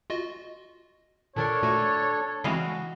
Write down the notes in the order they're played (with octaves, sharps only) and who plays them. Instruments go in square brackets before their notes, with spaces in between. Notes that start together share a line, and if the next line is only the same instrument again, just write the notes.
[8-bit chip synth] F4 F#4 D#5
[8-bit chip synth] A#2 D#3 A#4 [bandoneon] D4 A4 [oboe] C#5
[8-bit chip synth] A#2 A3 F#4
[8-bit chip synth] C#3 G#3 C4 [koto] E3 D#5 F5 [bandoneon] F#4